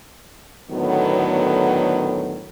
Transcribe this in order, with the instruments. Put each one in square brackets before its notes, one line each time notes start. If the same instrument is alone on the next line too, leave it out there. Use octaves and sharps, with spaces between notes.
[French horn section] A2 D3 D#3 F#3 B3